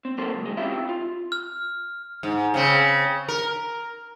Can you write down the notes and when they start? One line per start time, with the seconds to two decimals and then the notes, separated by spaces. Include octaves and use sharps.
0.05 C4
0.18 F#3 A#3 A4 C5
0.34 C#2
0.46 E3 G#3
0.57 C4 C#4 E4 F4 G4 E5
0.89 F4
1.32 F6
2.23 G#2
2.54 C#3 C4
3.28 A#4